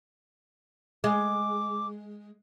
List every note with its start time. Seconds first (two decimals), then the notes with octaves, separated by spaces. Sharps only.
1.04 G#3 D6